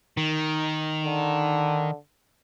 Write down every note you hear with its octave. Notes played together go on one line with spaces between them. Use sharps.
D#3
D3